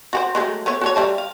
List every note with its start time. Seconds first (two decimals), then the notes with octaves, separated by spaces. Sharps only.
0.13 F#4 G4 C5
0.35 F#3 G#3 A3
0.66 A3 B3 C#5
0.81 F#4 A4 C#5
0.96 G3 E5 A5
1.18 F5